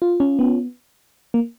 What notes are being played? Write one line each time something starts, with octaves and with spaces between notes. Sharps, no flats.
F4
C#4
B3
A#3